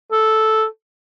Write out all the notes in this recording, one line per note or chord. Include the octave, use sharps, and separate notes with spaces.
A4